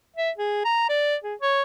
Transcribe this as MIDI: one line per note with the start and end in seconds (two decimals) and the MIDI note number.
0.16 0.31 76
0.38 0.62 68
0.64 0.86 82
0.89 1.15 74
1.24 1.34 68
1.41 1.62 73